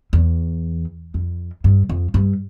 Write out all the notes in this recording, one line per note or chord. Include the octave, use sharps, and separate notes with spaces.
E2
F2
G2
F2
G2